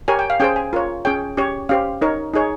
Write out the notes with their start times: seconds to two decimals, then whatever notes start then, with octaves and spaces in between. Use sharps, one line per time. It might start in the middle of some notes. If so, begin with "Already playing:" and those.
0.08 G4 A#4 C#5 G#5
0.19 G5
0.30 F5
0.40 C#4 G#4 C5 G5
0.56 G#5
0.73 F4 A#4 C#5
1.05 C#4 G#4 C#5 G5
1.37 C#4 G4 C#5
1.69 C#4 G4 C5 F5
2.01 D#4 A#4 C#5
2.34 D#4 G#4 C#5